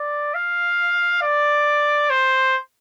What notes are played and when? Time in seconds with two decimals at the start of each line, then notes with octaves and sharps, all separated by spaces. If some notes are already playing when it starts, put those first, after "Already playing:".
Already playing: D5
0.34 F5
1.22 D5
2.10 C5